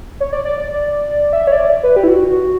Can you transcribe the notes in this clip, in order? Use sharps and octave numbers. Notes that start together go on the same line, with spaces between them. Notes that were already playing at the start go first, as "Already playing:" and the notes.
C#5
D5
D5
D5
E5
C#5
D5
B4
G4
E4
F#4